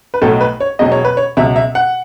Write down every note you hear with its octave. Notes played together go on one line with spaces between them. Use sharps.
B4
B1 A2 F#3 A4
B4
C#5
E1 E2 B2 F#3 D#5
C#5
B4
C#5
C#2 B2 F#3 E5
E5
F#5